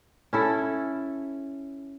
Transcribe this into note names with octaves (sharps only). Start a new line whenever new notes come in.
C#4 E4 A4